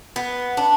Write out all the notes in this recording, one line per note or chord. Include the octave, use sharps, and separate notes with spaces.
B3
D4